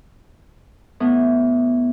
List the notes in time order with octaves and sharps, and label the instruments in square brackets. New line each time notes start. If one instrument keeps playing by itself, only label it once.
[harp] A2 B3